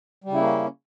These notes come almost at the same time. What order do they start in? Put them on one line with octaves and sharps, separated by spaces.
G3 C#3 E4 A#3 C#4